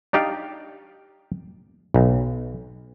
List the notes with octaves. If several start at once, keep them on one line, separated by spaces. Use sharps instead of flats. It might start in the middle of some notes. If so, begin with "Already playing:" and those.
D4 D#4 G4 D5 F5
B1